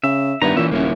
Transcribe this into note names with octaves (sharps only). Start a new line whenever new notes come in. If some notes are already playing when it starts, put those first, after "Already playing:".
C#3 E5
G2 D#3 B3 E4 A#5
A#2 E3 C#4 E5
D#1 F#3 A#3 C#4 E4